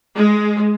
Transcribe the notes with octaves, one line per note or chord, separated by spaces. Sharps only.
G#3